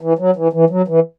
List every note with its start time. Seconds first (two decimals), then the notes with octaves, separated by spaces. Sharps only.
0.01 E3
0.19 F#3
0.36 E3
0.53 E3
0.70 F#3
0.88 E3